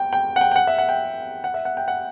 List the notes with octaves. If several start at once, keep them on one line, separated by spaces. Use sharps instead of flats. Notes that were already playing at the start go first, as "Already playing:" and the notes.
Already playing: G5
G5
F#5
G5
G5
F#5
E5
F#5
G5
F#5
E5
F#5
G5
F#5